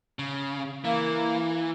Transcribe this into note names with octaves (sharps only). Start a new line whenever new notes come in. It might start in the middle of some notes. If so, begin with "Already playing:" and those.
C#3
E3 A#3